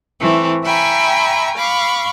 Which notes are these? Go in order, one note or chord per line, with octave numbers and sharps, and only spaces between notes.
E3 A3 C4
E5 G5 G#5 A#5 B5 C#6
F5 B5 C#6 D6